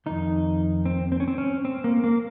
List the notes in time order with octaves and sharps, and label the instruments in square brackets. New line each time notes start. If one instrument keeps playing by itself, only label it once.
[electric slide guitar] F2 D#3 D#4
C4
C4
C#4
C4
C#4
C4
A#3
A#3